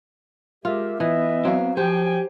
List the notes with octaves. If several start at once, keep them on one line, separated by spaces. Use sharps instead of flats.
G#3 F4 G4 A#4 E5
E3 B3 D#5 E5
F#3 C4 F5
F3 G4 C5 G5 G#5